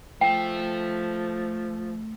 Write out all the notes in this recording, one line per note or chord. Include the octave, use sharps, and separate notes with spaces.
F3 A3 E5 G5